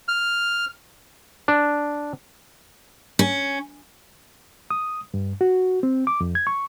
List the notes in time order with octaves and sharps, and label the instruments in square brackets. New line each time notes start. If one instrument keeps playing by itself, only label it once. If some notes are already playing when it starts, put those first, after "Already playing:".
[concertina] F6
[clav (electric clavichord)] D4
[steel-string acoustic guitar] C#4
[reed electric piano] D#6
G2
F#4
C4
D6
F2
G#6
C#6